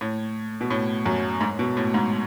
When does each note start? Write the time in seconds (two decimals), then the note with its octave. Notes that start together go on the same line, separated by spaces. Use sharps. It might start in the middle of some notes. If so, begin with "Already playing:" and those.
0.01 A2
0.61 B2
0.70 A2
1.06 F#2
1.41 G#2
1.59 B2
1.77 A2
1.94 G#2